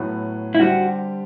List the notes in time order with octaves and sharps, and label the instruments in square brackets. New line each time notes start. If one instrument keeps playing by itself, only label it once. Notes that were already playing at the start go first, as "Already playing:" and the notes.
Already playing: [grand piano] A2 F#3 B3
[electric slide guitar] E4
[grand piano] D3 G3 C4 G4 [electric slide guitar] F#4